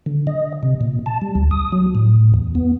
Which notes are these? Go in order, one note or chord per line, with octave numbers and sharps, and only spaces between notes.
D3
D#5
C3
A#2
A5
G3
D2
D#6
F#3
A2
E2
B3